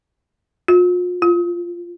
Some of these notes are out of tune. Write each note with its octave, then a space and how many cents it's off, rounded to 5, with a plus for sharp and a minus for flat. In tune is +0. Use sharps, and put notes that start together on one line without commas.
F4 +40
F4 -5